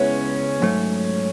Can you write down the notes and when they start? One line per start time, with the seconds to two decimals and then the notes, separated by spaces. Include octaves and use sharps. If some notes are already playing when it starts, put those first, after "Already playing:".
Already playing: C#2 C#3 G#3 B3 C#4 E4
0.62 G#2 F#3 A3